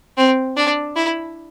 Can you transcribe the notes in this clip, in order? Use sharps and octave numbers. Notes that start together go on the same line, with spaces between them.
C4
D4
E4